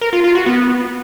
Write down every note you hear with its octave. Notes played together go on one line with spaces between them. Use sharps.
A#4
F4
F4
F#4
B3